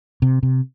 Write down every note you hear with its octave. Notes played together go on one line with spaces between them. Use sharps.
C3
C3